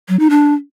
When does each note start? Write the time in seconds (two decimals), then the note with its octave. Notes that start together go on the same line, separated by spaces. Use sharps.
0.08 F#3
0.19 D#4
0.30 D4